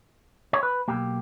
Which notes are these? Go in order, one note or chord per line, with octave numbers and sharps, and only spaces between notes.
C#5
B4
B1 A#2 A#3 G4